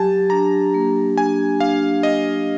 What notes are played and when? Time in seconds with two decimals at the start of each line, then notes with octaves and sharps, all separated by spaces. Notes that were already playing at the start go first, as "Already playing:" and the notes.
Already playing: F#3 G4 G#5 A5
0.30 D4 A#5
0.74 A#3
1.17 D4 G#5
1.60 D4 F5
2.03 D4 D#5